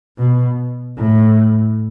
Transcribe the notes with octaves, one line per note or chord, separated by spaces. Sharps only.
B2
A2